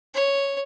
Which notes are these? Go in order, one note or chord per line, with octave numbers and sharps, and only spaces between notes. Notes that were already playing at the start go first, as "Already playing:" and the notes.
C#5